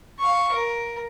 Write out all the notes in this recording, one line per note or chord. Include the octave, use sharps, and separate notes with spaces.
F5 C#6
A#4